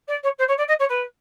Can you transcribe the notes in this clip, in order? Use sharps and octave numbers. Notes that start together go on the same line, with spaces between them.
D5
C#5
C5
C#5
D5
D#5
C#5
B4